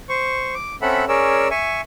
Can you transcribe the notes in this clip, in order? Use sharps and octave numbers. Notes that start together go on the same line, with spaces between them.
C5 C#6
D6
C4 C#4 A4 E5 F#5 B5
C#4 G#4 A#4 C#5 D5 E6
E5 G#5 C#6